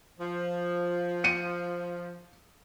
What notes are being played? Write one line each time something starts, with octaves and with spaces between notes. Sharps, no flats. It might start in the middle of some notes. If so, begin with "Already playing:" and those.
F3
C#7 D#7